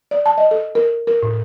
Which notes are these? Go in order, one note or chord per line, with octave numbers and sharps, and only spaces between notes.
D5
A5
D#5
A4
A#4
A#4
A2